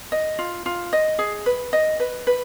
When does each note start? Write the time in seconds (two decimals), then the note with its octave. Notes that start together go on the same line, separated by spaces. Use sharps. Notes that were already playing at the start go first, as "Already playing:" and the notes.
0.12 D#5
0.39 F4
0.66 F4
0.93 D#5
1.19 G#4
1.46 B4
1.73 D#5
2.00 B4
2.27 B4